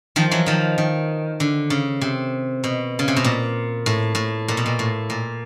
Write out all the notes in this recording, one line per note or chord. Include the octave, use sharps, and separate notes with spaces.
D#3 F3
E3 F#3
D#3 F3
D#3
D3
C#3
C3
B2
C#3
C3
B2
A#2
A2
A2
A#2
B2
A#2
A2
A#2